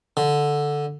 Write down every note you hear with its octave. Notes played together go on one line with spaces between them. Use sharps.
D3